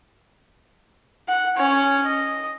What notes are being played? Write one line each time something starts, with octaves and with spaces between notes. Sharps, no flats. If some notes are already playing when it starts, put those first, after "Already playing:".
F#5
C#4 C#5
D#5